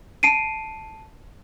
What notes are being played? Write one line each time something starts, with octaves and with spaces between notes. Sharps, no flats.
A5 C7 D7 D#7